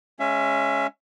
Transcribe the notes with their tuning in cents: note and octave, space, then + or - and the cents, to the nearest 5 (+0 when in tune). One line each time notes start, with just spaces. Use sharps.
G#3 +0 C#4 +0 E5 +30